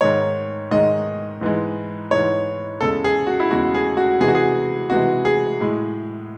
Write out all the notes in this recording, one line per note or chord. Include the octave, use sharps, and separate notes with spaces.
G#2 D#3 G#3 C#5
G#2 D#3 G#3 D#5
G#2 E3 G#3
G#2 E3 G#3 C#5
E2 C#3 G#3 A4
G#4
F#4
E4
E2 C#3 G#3 F#4
G#4
F#4
C3 E3 G#3 G#4
F#4
G#4
C3 E3 G#3 F#4
G#4
A2 G#3